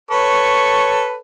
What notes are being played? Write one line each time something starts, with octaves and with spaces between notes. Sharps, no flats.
A4 B4 C#5 C#6